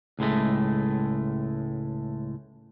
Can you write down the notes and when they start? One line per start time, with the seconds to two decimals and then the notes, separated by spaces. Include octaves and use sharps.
0.19 C#2 A2 G#3 A3